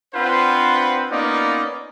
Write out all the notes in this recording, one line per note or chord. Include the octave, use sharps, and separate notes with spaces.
C4 D4 F4 B4 C5 F#5
A#3 B3 C#4 D#4 F4 D5